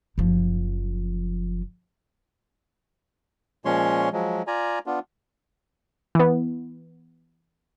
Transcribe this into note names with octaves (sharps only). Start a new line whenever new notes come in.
F#1 F3
A#2 F3 G#3 C#4 C#5 C6
F3 F#3 G#3
F4 D5 G#5 A#5
B3 D4 F4
E3 B3